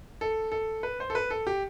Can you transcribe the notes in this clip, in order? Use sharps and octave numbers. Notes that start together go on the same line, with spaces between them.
A4
A4
B4
C5
A4
B4
A4
G4